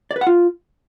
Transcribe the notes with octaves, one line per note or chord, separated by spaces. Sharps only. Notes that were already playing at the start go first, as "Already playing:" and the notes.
D5
B4
F#5
F4